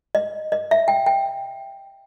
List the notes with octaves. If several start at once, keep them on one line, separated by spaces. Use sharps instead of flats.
D#5
D#5
E5
G5
G5